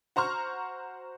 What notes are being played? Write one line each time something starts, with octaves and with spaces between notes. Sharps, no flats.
F#4 C5 A#5 C#6 F6